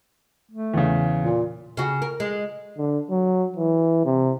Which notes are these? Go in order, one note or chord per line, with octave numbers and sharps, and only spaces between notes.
A3
E2 C#3
A#2
C#3 F#4
A#4
G#3
D3
F#3
E3
C3